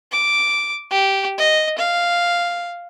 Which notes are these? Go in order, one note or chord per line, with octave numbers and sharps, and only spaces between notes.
D6
G4
D#5
F5